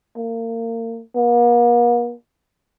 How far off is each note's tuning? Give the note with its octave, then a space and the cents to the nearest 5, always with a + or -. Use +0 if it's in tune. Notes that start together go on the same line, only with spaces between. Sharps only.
A#3 -30
A#3 +45